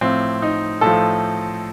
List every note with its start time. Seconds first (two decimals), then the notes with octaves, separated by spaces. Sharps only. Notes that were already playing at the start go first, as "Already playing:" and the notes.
0.01 A2 F3 C4
0.42 D#4
0.81 A2 F3 A4